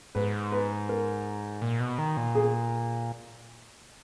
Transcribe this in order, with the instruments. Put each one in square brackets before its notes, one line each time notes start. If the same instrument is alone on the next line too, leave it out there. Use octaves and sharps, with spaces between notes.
[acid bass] G#2 [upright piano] B4
[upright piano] B4
A#4
[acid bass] A#2
B2
D#3
A#2
[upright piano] G#4